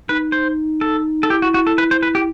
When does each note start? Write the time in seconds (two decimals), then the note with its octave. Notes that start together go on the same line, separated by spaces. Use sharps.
0.09 D#4 B4
0.32 C5
0.81 A4
1.23 A4
1.30 E4 G4
1.42 F#4
1.54 F#4
1.67 A4
1.78 B4
1.91 C5
2.02 B4
2.15 G4